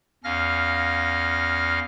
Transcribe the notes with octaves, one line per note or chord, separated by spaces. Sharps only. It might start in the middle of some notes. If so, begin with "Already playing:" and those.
E2 C#4 F5 F6 A#6